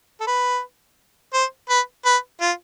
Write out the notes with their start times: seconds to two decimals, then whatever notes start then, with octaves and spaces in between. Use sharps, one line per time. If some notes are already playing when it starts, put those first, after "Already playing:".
0.21 A4
0.27 B4
1.34 C5
1.69 B4
2.06 B4
2.41 F4